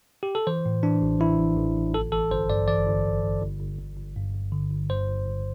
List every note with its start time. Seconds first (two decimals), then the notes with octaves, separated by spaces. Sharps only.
0.23 G4
0.35 A4
0.47 E3 C5
0.66 A2
0.83 E3 D4
1.02 A1
1.20 E3 E4
1.39 A1
1.57 A1
1.76 A1
1.94 G1 A4
2.12 E3 A4
2.31 G1 C5
2.50 G2 D5
2.68 E3 D5
2.87 G1
3.05 G1
3.24 G1
3.42 G1
3.60 G1
3.78 G1
3.97 G1
4.16 G2
4.35 G2
4.52 D3
4.70 G1
4.89 G2 C5
5.07 G1
5.26 G1